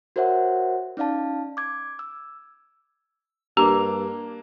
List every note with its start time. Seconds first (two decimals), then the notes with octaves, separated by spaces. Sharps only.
0.16 F#4 A#4 C5 C#5 E5 F#5
0.97 C#4 D#4 D5 F5 A5
1.57 D6 G#6
1.99 E6
3.57 G2 A#3 D4 G4 A#5 D6